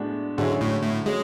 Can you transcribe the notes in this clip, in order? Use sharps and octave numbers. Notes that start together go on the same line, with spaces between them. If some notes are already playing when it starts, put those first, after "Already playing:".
Already playing: A2 G#3 B3 D4 F#4
G#2 D3 F#3 C#4 E4 G#4
A2
A2
F#3 G#3 C#4